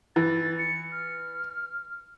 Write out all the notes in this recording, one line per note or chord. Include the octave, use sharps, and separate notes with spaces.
E3 A6
C#7
F6